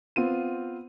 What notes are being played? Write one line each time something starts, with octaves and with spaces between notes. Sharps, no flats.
B3 C4 F4 D#7